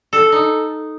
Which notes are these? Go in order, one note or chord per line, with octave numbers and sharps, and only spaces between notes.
A4
D#4